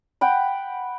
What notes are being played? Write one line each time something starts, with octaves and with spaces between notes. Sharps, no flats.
F#5 G5 B5